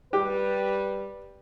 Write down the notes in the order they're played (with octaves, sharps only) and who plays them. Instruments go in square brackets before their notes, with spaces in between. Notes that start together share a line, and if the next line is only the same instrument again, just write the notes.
[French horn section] G3 B4 [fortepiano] G4